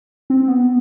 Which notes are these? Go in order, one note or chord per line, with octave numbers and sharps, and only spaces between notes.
C4
B3